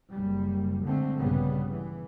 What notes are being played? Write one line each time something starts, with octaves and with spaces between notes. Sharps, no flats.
F#1 G3
D3 G#3 A3 C4
A#1 G2 C#3 G3 B3
E3